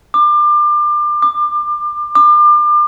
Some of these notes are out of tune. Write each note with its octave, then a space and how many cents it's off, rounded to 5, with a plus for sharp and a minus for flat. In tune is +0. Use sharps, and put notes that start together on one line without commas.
D6 +30
D6 +40
D6 +35